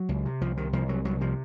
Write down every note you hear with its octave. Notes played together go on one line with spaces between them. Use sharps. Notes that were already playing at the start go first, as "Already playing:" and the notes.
Already playing: F#3
C#2
C3
C2 F3
C3 D#3
C2 F3
C3 F#3
C2 F#3
C3 F3